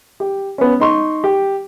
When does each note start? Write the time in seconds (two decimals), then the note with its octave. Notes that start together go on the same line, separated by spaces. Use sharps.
0.20 G4
0.58 B3 C#4
0.80 D#4 C6 C#6
1.24 G4